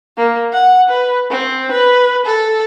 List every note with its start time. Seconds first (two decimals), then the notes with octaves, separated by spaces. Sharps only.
0.17 A#3
0.52 F#5
0.89 B4
1.30 C4
1.72 B4
2.25 A4